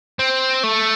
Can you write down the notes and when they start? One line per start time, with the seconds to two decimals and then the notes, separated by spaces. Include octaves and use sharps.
0.19 C4
0.64 A3